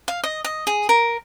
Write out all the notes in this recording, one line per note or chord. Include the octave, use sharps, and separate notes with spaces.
F5
D#5
D#5
G#4
A#4